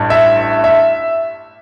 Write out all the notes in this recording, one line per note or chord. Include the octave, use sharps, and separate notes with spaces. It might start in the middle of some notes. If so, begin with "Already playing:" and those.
Already playing: A1 G2
E5
E5